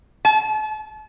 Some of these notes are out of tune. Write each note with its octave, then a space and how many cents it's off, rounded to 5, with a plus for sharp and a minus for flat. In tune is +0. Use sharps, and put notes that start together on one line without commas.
A5 -35